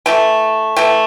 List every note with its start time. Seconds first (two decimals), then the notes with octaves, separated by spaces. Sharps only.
0.06 E3 A3 G5
0.76 E3 A3 G5